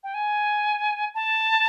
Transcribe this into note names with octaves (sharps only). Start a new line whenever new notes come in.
G5
G#5
A5